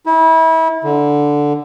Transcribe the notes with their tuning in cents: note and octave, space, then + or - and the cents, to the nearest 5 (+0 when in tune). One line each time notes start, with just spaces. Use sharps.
E4 -30
D3 +0